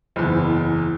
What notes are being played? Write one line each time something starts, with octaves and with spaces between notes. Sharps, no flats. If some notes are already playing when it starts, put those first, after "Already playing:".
F#1 E2